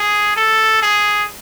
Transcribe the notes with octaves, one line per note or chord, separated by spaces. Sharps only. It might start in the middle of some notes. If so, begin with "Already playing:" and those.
Already playing: G#4
A4
G#4